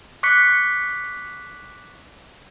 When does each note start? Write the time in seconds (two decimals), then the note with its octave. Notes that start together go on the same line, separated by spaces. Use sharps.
0.23 C#6 D6 F#6 B6 C#7